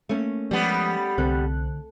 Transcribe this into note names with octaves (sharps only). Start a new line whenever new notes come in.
A3 A#3 C#4
F3 G3 G#3 B3
C2 D3 C4 A4 F#6